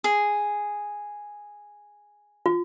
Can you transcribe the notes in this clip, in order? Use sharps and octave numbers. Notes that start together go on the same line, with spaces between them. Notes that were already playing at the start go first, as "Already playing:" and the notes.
G#4
F4